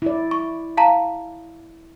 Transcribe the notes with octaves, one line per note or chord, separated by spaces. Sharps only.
E4 D5
C#6
F5 A5 A#5